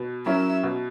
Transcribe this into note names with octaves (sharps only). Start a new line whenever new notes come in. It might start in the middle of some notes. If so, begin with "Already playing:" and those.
Already playing: B2
F#3 C#4 E4 A#4 E5
B2